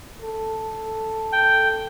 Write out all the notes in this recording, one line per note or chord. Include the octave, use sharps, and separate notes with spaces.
A4
G5